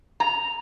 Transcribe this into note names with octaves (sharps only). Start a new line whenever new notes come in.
A#5